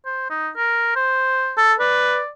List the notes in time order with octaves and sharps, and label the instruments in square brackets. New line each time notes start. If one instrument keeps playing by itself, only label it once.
[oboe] C5
D#4
A#4
C5
[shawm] A4
[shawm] B4 [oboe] D5